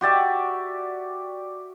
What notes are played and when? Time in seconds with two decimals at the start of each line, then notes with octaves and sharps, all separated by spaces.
0.01 F#4 G4 D5 E5